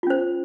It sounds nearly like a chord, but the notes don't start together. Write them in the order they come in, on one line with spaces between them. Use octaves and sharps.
F4 C#4 C5